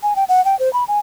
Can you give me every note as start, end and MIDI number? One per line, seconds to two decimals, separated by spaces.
0.03 0.14 80
0.16 0.24 79
0.29 0.43 78
0.45 0.57 79
0.59 0.71 72
0.73 0.84 83
0.88 0.99 80